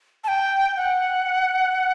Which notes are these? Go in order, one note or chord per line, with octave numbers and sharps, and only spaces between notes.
A5
G5
F#5